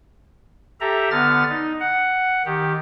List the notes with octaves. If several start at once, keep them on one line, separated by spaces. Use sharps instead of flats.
G4 A4 E5 A#5
D3 B3 F6 A6
D#4
F#5
D#3 G4